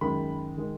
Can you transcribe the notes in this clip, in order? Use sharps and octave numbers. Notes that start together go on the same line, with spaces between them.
F#2 D#3 G#3 B5
D#3 G#3